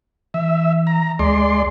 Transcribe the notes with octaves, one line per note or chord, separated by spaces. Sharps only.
E3 E5
A#5
D2 G#3 D5 C6